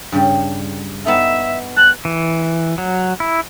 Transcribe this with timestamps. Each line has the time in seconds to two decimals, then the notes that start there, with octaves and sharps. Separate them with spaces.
0.12 G2 C#3 G3
1.05 B3 D#4 A4 E5
1.76 A5 F#6
2.05 E3
2.78 F#3
3.20 E4